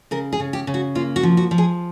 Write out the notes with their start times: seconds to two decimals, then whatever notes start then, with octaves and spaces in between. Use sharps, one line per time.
0.11 C#3 A#4
0.33 G#4
0.40 C#3
0.53 G4
0.67 C#3
0.74 F#4
0.95 A#3 F4
1.16 F#4
1.23 F3
1.37 F#4
1.51 F3
1.58 G#4